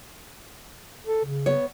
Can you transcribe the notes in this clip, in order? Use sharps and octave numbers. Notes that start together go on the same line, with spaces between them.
A4
C#3
B3 C#5